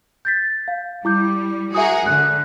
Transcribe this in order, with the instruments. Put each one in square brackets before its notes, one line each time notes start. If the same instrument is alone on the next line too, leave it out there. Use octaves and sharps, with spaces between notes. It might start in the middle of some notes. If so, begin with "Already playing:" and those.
[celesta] G6 A6 B6
F5
[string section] G3 [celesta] E4 D6 G6
[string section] F#4 G#4 A#4 [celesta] E5 D#6
[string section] D3 [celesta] F#6